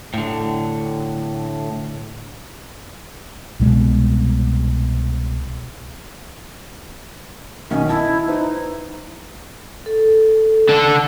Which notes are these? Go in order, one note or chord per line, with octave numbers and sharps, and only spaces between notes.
A2 D3
C2 B2 G3 G#3
B1 D#3 C#4 D#5
E4 D#5 A5
D#4 E4 B4 C5
A4
D3 A4